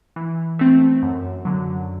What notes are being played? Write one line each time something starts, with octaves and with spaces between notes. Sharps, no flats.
E3
A3 C4
F#2
D3 F#3